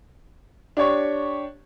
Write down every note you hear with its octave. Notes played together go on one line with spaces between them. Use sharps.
D4 G4 C#5 C#6